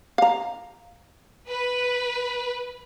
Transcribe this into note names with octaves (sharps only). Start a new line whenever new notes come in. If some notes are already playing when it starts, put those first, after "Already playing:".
F5 A#5
B4